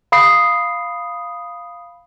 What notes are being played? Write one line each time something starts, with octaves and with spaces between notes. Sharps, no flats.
F5 B5 D#6 C7